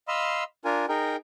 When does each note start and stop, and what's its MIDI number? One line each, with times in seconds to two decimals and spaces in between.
0.08 0.44 75
0.08 0.44 77
0.08 0.44 83
0.08 0.44 84
0.08 0.44 88
0.65 0.86 62
0.65 0.86 65
0.65 0.86 70
0.65 0.86 80
0.89 1.16 63
0.89 1.16 68
0.89 1.16 70
0.89 1.16 79